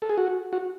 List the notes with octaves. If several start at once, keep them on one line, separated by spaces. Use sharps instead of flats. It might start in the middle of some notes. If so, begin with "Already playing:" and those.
A4
G#4
F#4
F#4